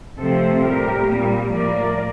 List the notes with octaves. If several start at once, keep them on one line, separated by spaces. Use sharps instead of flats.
C3 F3 A3 C4 A4 C5
A2 G3 C4 G4 A#4
A#2 G3 A#3
A2 F3 A#3 A#4 D5